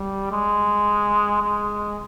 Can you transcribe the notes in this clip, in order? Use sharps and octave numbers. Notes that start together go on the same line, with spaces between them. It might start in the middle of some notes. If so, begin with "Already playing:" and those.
Already playing: G3
G#3
G#3